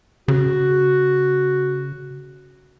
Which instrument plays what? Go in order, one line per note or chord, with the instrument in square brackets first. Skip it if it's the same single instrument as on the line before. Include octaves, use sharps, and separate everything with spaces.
[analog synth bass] C#3 [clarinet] F#4